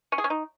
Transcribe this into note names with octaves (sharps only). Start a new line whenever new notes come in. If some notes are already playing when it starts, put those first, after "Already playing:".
C#4
G#4
C#4
D#4